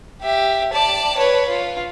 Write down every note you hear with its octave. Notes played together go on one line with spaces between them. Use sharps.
G4 E5
D5 A5
B4 C#5
F4